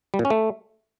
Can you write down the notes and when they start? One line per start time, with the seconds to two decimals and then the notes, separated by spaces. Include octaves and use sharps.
0.14 G3
0.19 A#2
0.25 C#4
0.30 A3